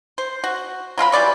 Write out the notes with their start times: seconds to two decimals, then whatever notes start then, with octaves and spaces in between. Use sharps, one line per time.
0.18 C5
0.44 F#4
0.98 F#3 F4 A#4 B5
1.12 E3 G3 D5 C#6